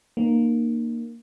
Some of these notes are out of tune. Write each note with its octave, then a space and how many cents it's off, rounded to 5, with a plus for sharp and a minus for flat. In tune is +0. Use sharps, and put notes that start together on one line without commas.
A#3 +0 D#4 -45